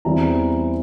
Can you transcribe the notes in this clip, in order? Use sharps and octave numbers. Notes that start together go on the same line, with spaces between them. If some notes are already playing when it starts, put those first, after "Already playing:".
E2 E3 G3 C4 A#5